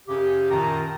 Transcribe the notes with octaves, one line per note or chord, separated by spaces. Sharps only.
F#2 C#3 C#4 G4
F#2 A#2 D#3 G5 A5 A#5